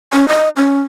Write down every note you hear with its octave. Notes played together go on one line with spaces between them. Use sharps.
C#4
D#5
C#4